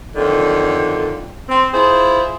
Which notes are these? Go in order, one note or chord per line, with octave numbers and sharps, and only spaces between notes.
F2 D3 D#3 F#3
C4
E4 F4 G#4 C5